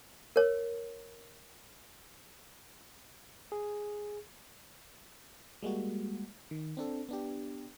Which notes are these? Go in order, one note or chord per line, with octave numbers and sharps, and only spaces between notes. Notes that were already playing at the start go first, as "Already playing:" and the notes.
A#4 C#5
G#4
G3 G#3 A#3 F#4
D#3
C4 D4 A4
B3 D4 G4